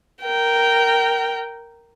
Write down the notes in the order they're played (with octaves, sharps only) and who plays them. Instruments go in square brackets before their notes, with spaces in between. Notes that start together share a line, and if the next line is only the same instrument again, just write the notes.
[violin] A#4 G5